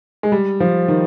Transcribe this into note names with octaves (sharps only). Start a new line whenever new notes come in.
G#3
G3
F3
D#3